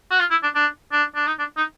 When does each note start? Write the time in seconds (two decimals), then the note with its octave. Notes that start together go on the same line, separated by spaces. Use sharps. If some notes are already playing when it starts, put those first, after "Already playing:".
0.11 F#4
0.20 F4
0.31 E4
0.43 D4
0.55 D4
0.92 D4
1.15 D4
1.27 D#4
1.39 D4
1.57 D#4